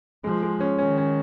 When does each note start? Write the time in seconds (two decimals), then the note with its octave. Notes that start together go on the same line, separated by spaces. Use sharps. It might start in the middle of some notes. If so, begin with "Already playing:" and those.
0.24 F3 G#3
0.43 G#3
0.60 C#4
0.78 D#3 C#4
0.98 C#4